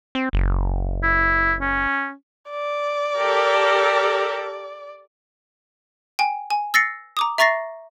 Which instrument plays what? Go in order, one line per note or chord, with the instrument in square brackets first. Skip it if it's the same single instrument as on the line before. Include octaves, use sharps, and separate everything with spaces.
[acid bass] C4
F#1
[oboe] E4
C#4
[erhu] D5
[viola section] G4 A4 A#4
[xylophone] G5 G#5
G#5
E6 A6 A#6 C7 C#7
A#5 D6 D#6
E5 A#5 C#6 A6 A#6 C7